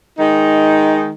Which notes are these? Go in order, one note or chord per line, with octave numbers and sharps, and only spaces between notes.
D#3 G#3 D#4